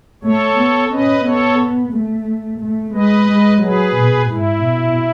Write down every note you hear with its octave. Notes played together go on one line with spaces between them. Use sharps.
A3 A4 C#5
B3
C#4 B4 D#5
B3 A4 C#5
A3
A3
G#3 B4 D#5
G#3
F#3 G#4 B4
B2
G#2 E4
B2